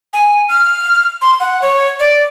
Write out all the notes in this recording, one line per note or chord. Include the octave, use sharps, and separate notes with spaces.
G#5
F6
C6
F#5
C#5
D5